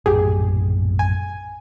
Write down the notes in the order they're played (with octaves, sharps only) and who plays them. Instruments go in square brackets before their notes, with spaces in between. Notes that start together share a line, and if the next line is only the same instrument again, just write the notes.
[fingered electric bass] A#1 F#2 A2 [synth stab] G4 G#4
[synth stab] G#5